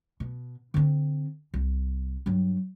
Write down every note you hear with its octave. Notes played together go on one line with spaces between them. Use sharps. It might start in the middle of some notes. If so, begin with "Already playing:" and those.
B2
D3 C4
C2
G2 F#3